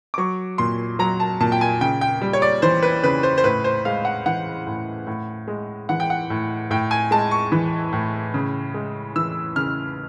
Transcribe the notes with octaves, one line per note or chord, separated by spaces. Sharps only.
D6
F#3 C#6
A#2 C6
F#3 A#5
A5
A#2 A5
G5
G#5
C#3 G5
G5
G3
C#5
D5
E3 C5
B4
C#3 B4
C5
C5
A2 B4
C5
G#3 F5
F#5
E3 F#5
A2
A2
G#3
E3 F#5
G5
F#5
A2
A2 G5
G#5
G#3 A5
C#6
E3
A2
C#3
G#3
E3 E6
C#3 F6